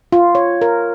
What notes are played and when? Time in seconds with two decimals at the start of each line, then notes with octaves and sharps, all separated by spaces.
0.12 F4
0.35 C#5
0.62 A#4